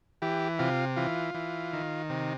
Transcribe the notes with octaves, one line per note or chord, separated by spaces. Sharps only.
E3 G4
C3 F4
E3 F4
E3
D#3
C3